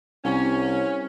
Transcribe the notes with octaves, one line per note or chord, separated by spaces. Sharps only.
C2 C#4